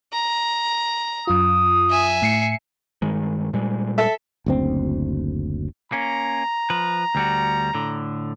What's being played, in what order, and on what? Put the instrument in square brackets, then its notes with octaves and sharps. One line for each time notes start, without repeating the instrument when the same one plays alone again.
[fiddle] A#5
[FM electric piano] F#2 F4 [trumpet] D#6
[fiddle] E5 G#5
[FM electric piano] A2 C7 C#7
[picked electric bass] G2 D#3 G#3
A#2 G3 G#3
[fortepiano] A4 E5
[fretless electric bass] F#1 D2 C4
[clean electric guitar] A#3 C#4 [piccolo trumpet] A#5
[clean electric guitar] F3 B4
D2 G3 F#4
A2 D3